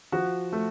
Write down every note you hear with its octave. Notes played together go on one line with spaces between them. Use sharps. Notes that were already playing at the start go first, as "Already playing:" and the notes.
F3 F#4
A3